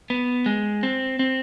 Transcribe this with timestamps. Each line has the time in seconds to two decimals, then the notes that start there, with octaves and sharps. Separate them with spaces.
0.10 B3
0.46 G#3
0.83 C4
1.19 C4